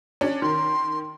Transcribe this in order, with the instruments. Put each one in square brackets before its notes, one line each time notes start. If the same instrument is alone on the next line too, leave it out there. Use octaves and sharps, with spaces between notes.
[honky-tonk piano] C#4 D4
[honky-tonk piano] D#3 A#4 [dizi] C6